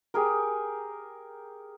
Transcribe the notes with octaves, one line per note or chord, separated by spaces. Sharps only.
G4 G#4 A#4